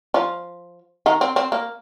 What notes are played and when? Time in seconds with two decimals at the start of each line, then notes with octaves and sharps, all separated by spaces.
0.14 F3 F4
1.06 D#3 D#4
1.21 C4
1.36 C4
1.52 A#3